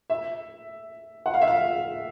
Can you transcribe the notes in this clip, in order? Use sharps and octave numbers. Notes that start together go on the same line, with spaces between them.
E5
F#5
F5
E5
F5